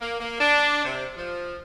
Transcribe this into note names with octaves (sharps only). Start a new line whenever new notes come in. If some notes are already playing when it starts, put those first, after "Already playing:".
A#3
A#3
D4
C3
F3